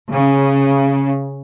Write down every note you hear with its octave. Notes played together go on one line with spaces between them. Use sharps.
C#3